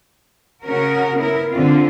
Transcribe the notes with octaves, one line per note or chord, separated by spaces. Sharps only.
C#3 C#4 F#4 A#4
B3 E4 A#4
D3 C4 F4